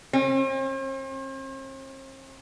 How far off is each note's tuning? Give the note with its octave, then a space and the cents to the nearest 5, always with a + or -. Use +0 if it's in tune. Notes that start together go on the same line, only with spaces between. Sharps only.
C4 +45